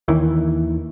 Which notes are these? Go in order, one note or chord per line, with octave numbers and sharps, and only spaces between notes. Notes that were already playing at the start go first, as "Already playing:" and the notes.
D#2 D#3 E3